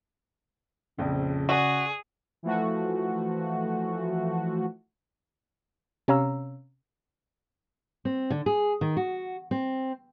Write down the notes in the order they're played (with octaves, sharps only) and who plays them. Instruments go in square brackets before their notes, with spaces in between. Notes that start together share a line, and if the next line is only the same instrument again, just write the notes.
[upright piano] A#1 F2 [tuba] C#3
[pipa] F#4 [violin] G#4 [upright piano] D5 F#5
[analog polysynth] E3 F3 A3 F#4
[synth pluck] C3 C#4 C#5 F5 A#5 E6
[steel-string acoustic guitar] C4
D3
G#4
D#3
F#4
C4